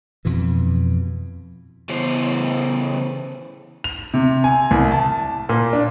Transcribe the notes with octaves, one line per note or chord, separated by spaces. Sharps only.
F2 B2 E3
C#3 E3 B3 C5
F7
C3
G#5
C2
A5
A#2
D4